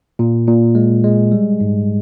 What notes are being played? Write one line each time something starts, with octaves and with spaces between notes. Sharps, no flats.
A#2
A#2
G#3
G#3
G3
G#2